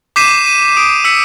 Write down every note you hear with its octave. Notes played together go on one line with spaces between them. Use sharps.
D6 G6 B6 C7 D#7 E7
D#7
D#6 D7
E6 B6 C#7